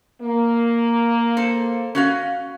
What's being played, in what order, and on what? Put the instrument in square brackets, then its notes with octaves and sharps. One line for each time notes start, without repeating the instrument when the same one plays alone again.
[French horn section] A#3
[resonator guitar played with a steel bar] A4 C5
C#4 F#4 F5